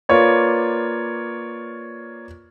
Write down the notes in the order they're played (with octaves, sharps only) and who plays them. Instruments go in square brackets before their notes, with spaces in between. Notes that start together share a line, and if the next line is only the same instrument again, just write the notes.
[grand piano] A#3 F4 B4 C#5 D5